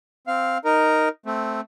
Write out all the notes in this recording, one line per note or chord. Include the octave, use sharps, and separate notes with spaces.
C4 F5
D#4 A#4
A3 C4